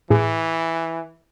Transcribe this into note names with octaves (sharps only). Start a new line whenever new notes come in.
A2 E3 G#4